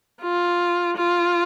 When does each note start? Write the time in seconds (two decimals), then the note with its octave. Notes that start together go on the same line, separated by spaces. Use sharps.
0.22 F4
0.97 F4